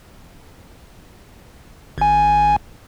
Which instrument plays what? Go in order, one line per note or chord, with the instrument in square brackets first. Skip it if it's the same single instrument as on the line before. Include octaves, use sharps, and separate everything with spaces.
[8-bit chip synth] G#1 G#5